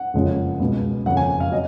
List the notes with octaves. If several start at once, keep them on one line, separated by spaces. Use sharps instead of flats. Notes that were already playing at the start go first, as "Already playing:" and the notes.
Already playing: F#5
F#1 F2 C#3 F3 G#3
C#2 B2 G#3
F#1 F2 C#3 F#5
G#5
F5
F#3 D#5